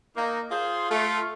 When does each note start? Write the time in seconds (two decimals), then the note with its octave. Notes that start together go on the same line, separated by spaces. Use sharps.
0.16 A#3 D#4
0.51 F4 G#4 C5
0.90 A3 F4